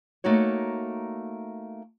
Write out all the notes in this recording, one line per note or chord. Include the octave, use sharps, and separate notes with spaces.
A3 A#3 D#4 F#4 C#5